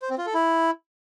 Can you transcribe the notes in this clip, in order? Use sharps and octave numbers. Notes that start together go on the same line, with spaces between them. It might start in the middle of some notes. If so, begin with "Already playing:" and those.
C5
C4
F4
A4
E4